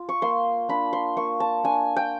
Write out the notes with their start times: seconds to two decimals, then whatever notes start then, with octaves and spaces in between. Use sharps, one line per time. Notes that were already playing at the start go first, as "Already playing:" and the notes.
Already playing: F4
0.09 C#6
0.22 A#3 C6
0.69 D4 B5
0.93 C6
1.17 A#3 C#6
1.40 A5
1.64 D4 G#5
1.96 G5